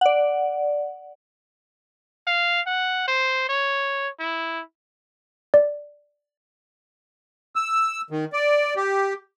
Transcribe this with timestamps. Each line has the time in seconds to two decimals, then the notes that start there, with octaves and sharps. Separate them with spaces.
0.01 D5 F#5
2.27 F5
2.67 F#5
3.07 C5
3.49 C#5
4.19 E4
5.54 D5
7.56 E6
8.10 D#3
8.33 D5
8.76 G4